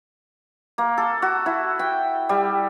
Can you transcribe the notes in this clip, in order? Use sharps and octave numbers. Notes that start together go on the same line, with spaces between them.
A#3
A4
F#4
E4
G5
G3